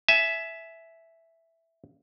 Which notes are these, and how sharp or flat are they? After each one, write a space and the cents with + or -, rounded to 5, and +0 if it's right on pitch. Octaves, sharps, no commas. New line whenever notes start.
E5 +0 G#5 +25